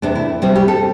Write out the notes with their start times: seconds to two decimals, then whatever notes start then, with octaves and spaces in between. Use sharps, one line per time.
0.02 E2 C3 A3 D4
0.15 E4
0.42 C3 G3 C4
0.55 G4
0.68 A4